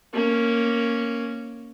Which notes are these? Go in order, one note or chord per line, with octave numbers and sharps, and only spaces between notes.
A#3 C#4